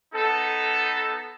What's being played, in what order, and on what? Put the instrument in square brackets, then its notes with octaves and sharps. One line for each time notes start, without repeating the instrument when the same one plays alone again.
[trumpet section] B3 D#4 A4